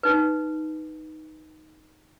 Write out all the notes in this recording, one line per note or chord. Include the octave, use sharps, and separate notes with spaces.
D#4 B4